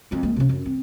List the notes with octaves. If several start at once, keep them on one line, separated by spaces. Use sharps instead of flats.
F2 G#3
G#3 A#3
C3 C#4
F#2
C4